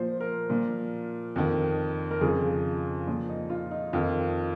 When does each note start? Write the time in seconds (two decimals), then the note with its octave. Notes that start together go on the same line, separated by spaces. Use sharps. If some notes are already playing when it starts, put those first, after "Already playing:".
Already playing: A#2 F3 C5
0.20 A#4
0.49 A#2 F3
1.36 F2 D#3
2.11 A#4
2.21 F2 C#3 F3 G#4
3.07 A#2 F3
3.29 D#4
3.50 F4
3.71 D#4
3.93 F2 D#3 F4